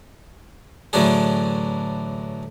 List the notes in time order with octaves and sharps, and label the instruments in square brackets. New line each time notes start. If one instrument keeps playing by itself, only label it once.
[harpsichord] A2 D3 E3 F#3 D4 G#4